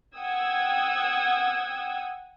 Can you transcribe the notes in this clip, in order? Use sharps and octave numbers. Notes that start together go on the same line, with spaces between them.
F#5 G5 D#6 E6 G#6